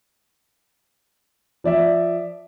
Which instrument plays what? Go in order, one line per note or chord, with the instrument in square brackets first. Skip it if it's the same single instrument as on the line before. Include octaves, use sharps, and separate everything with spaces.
[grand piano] F3 D5 E5